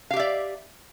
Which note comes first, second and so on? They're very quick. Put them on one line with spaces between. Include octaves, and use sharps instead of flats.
F5 G4 E5 D5